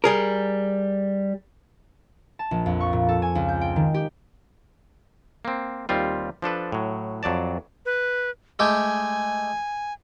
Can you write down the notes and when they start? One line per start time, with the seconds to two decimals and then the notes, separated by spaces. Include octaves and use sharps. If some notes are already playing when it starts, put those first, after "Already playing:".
0.04 G3 G#4 A#4
2.39 A5
2.51 A#1
2.66 F2
2.80 C#6
2.93 A#2
3.09 A4
3.22 G#5
3.35 C#2
3.48 G6
3.61 G5
3.76 D#3
3.94 G4
5.45 A#3 C4
5.89 D#2 G3 C4 F4
6.42 F3 D4 A4 B4
6.72 A2 F#3
7.23 F2 F#3 D5 A5
7.86 B4
8.59 G#3 A3 G4 G#5